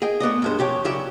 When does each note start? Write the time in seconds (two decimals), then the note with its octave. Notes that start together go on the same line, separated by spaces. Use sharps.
0.02 G#4 D#5 G5
0.20 A3 B3 D5 D#5
0.42 G2 G#3 C5
0.59 F2 G4 C#5 G5
0.85 C#3 F#3 G4 D5 E5